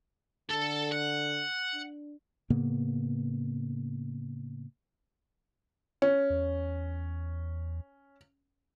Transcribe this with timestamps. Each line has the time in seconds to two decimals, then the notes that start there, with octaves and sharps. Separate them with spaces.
0.51 D3 A4
0.92 F#5
1.74 D4
2.50 A2 C#3 A#3 B3
6.02 C#4
6.30 E2